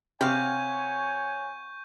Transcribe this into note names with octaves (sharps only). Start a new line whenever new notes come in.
C3 G4 C#5 F5 F#5 G#5 C#6 G6